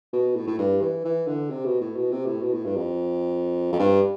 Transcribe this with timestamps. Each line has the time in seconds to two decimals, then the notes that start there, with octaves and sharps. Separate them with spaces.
0.13 B2
0.36 A2
0.47 A2
0.59 G2
0.81 E3
1.05 E3
1.27 D3
1.50 C3
1.65 B2
1.81 A2
1.96 B2
2.11 C3
2.26 A2
2.42 B2
2.53 A2
2.65 G2
2.76 F2
3.72 F2
3.79 G2